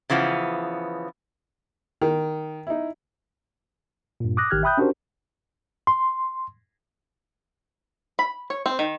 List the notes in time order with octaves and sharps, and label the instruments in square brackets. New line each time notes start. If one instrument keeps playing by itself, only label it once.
[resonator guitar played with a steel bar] C#3 E3 F3 B3
[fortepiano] D#3
D#4 E4
[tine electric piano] G2 A#2
D6 D#6 F#6 A#6
A1 D#3 G4 F6 F#6 G#6
E5 G5 B5 D#6 F#6 G6
C#4 D4 F#4 G4 A#4 C5
[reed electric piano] C6
[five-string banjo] B5
C#5
C4
D#3